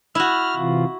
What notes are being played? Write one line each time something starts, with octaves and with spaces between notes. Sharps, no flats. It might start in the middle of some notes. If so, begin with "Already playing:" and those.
E4 F#4 F6
C3 E3 F4